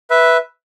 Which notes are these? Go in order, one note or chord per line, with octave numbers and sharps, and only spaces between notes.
B4 E5